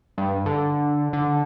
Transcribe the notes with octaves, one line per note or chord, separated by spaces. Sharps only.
G2
D3
D3